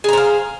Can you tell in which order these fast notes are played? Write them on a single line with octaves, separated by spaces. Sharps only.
G#4 A#5 C5 F5